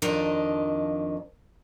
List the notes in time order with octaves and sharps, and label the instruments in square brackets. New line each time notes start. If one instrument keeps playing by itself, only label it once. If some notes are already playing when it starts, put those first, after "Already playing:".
[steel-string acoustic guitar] F2 D#3 F3 D4 D#5 A#5